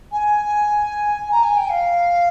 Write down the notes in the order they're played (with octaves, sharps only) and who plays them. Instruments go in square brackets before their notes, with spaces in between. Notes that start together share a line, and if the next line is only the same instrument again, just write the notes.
[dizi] G#5
A#5
G#5
G5
F5